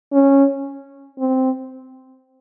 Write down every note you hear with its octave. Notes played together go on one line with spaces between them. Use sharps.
C#4
C4